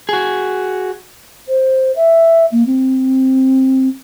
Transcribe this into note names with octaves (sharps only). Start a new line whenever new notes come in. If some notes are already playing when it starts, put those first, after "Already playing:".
F#4 G#4
C5
E5
A#3
C4